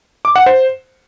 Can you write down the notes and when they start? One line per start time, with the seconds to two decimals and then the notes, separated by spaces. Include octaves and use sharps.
0.25 D6
0.36 F#5
0.46 C5